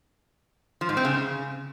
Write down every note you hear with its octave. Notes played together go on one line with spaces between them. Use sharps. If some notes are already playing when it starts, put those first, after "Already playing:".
F3
G#2
C4
C#3